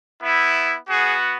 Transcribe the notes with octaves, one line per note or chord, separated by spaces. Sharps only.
B3 E4
B3 F#4 G#4